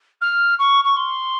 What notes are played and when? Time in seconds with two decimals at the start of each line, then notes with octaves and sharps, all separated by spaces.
0.21 F6
0.58 C#6
0.84 C#6
0.96 C6